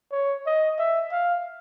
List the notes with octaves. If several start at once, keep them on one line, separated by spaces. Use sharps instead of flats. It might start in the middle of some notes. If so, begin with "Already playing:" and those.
C#5
D#5
E5
F5